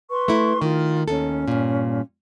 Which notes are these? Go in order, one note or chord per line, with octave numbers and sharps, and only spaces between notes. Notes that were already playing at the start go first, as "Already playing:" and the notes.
B4 C6 C#6
A3 E4
D#3 F4 A#4
D#2 C#4 A4
G2 A#2